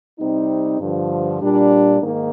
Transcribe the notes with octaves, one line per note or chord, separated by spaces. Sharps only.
C3 G3 C4 D#4
G2 D3 F3
A#2 G3 D4
G#2 D#3 A#3